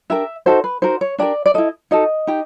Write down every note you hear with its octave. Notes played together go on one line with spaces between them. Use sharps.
D4 G4 A#4 E5
D#4 F#4 A4 C5
B4
D#4 F#4 A#4 C5
C#5
D4 G4 A#4 D5
D5
E4 A4 D#5
D#4 F#4 A4 D#5
D#4 G4